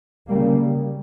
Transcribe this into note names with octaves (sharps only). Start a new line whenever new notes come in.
C#3 G3 A#3